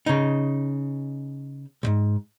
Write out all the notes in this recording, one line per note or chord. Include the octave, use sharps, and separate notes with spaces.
C#3 D#4
B1 G#2